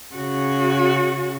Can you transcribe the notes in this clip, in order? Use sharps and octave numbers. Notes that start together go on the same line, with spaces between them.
C#3 F#4